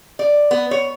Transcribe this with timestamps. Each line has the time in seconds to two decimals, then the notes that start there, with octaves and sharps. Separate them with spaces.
0.19 D5
0.51 B3
0.71 C#5